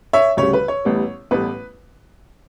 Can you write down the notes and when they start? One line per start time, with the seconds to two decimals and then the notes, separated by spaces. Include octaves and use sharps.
0.13 C#5 E5
0.37 D2 C#3 G3 C#5
0.53 B4
0.68 C#5
0.85 A1 A2 G3 B3
1.31 A1 A2 G3 B3 B4